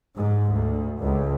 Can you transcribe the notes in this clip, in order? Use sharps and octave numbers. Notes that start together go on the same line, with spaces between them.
G#2
D2
C#2